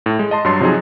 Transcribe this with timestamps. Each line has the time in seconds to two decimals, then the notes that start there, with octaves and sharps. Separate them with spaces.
0.06 A2
0.19 G#3
0.31 D#5 A5 C6
0.44 G2 F#3 C#5 C6 A6
0.60 C3 F3 F#3 D#4 F#4 G#4